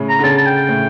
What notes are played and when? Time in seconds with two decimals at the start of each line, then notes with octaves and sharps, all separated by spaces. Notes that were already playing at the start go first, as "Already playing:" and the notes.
Already playing: A2 C#3
0.09 A#5
0.19 D3
0.23 C#3 A5
0.38 A5
0.46 G5
0.69 A2